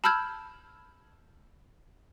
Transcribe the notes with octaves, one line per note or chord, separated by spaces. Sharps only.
A5 B5 E6 F6 G6 G#6